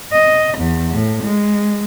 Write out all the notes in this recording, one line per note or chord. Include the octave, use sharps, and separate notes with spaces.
D#5
E2
A2
G#3